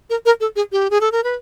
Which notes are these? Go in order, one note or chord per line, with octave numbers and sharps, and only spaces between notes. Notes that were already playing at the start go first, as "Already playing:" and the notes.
A#4
A#4
A4
G#4
G4
G#4
A4
A#4
B4